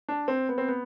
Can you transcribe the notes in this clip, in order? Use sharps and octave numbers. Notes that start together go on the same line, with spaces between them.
D4
C4
B3
C4
B3